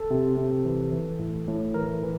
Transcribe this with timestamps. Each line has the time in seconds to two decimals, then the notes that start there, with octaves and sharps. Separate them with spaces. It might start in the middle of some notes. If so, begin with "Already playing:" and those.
Already playing: A4
0.10 C3
0.37 C3
0.65 E3
0.92 E3
1.19 A2
1.48 A2
1.74 E3 A#4
2.03 E3